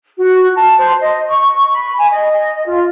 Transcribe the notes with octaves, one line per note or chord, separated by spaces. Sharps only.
F#4
A5
C5
D#5
C#6
B5
G#5
D#5
F4